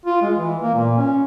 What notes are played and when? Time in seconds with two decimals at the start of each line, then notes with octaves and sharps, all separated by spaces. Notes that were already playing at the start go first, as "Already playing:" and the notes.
0.06 F4
0.22 G#3
0.35 E3
0.62 A#3
0.74 A#2
0.98 C#4